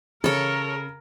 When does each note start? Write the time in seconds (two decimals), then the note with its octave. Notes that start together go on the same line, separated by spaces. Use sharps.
0.24 C#3 A4 A#4 C#5